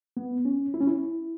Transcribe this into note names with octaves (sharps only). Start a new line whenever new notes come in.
B3
C#4
E4
C#4
E4